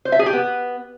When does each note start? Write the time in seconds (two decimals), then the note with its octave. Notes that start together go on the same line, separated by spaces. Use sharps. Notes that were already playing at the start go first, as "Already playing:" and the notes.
0.05 C5
0.12 E5
0.19 G#4
0.26 G4
0.33 B3